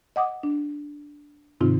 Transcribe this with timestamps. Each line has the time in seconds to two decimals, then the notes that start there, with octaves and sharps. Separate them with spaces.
0.16 D#5 F#5 D6 D#6
0.43 D4
1.61 G#2 C3 D#3 C4 D#4 F4